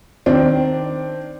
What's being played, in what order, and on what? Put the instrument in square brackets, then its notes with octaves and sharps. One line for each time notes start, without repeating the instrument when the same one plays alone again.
[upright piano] D#3 C4 D4